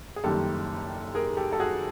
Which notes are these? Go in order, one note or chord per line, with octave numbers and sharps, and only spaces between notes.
G#4
F#1 F#2 D#3 G3 G4 A4
G#4 A#4
G4 A4
A4
F#4 G#4